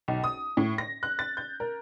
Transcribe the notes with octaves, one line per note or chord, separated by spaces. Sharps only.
B1
D#6
A2
A#6
F#6
A6
G6
A#4